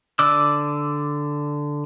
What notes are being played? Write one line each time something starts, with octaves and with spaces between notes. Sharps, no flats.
D3 D5 D6 E6